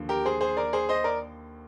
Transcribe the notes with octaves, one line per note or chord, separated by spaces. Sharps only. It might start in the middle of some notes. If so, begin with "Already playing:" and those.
Already playing: D#2 D3 F3
G4 A#4
G#4 C5
G#4 C5
A#4 D5
G#4 C5
C5 D#5
A#4 D5